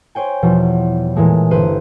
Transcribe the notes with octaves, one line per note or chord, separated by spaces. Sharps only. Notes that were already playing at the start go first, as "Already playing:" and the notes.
C5 C#5 G5 G#5
E2 B2 F3 G3
A#2 E3 G#3 A3
G1 G4 B4 C5 D#7